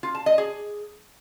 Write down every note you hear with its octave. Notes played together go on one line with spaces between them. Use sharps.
F4
A5
D#5
G#4